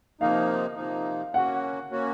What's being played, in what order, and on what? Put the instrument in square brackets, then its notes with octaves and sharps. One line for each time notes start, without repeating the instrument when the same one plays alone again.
[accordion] C3 F3 A#3 D#4 [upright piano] F5
[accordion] C3 F3 A#3 D#4
[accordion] A#3 C#4 F#4 [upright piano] F#5
[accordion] A#3 C#4 F#4